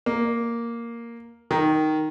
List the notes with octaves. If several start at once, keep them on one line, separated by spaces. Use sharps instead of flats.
A#3
D#3